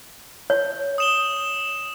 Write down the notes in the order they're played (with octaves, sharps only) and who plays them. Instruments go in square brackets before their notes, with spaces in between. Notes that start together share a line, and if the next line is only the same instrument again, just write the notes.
[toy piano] C#5
[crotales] D#6 E7 G7